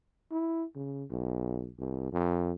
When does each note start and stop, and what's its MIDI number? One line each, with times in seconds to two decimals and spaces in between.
0.31 0.64 64
0.76 1.04 49
1.10 1.70 35
1.79 2.10 36
2.12 2.52 41